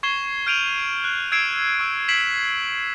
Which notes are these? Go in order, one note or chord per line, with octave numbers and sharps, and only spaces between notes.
C#6 G#6 C7 E7 G7
F6 G6 D7 D#7 F7 F#7
F#6
E6 G#6 C7 D7 E7
C#6 E6
G#6 B6 C7 D7 E7 F#7